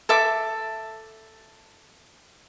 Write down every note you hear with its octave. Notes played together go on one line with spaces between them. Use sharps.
A4 E5 D6